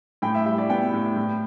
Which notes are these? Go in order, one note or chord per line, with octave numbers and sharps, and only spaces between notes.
A2 G5
E5
G3 E5
D5
B3 G5
A2
A2